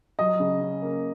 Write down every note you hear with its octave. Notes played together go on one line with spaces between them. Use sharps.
F#3 D#5
C#3
C#4
A#3